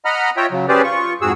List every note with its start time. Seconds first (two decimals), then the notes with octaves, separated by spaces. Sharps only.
0.05 D#5 F#5 A#5 B5 F6
0.37 F4 C#5 E5 G5 A#5
0.51 C#3 F#3
0.69 C#4 G4 G#4 B4 C5 D5
0.84 F4 C#6
1.21 F2 G#2 F#4 G#4 E6